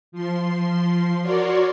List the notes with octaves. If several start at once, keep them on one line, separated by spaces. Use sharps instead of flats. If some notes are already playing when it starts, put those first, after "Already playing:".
F3 C6
F#4 A#4 C#5 D5 C6